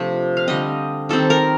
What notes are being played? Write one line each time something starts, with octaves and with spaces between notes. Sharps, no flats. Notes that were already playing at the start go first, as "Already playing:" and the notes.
Already playing: C3 F3 A3 C4 D4
F5
D3 G3 C4 D#5
D#3 G3 C4 A4
A#4